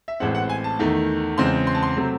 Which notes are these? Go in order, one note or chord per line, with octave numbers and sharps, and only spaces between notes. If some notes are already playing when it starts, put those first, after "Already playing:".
E5
A1 A2 G#3 C4 F#5
F#5
G#5
A5
E2 D#3 A3
E2 C#3 G#3 C4 C6
C6
A5
C6
C3 F#3 A3 C4